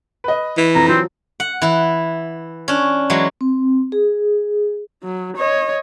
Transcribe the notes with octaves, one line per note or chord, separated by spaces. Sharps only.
B4 D#5
E3
F2 A#5
F3 F#3 C4
F#5
E3 E4
C#4 D4
E3 F#3 G#3
C4
G#4
F#3
C#5 D#5